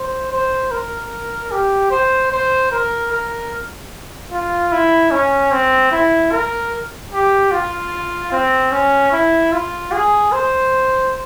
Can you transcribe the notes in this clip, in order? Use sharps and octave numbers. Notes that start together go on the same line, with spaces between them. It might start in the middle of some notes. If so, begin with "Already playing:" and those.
Already playing: C5
C5
A#4
G4
C5
C5
A#4
A#4
F4
E4
C#4
C4
E4
A#4
G4
F4
C4
C#4
E4
F4
G#4
C5